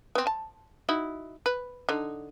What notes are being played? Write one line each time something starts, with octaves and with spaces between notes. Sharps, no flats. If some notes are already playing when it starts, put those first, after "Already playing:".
B3 C4
A5
D#4 E4 F#4
B4
D3 D#4